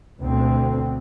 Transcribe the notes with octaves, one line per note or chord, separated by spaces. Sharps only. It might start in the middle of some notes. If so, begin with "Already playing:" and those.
D2 B2 D3 C4